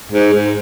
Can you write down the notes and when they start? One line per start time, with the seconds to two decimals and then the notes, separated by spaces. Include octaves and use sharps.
0.12 G#2
0.34 G#2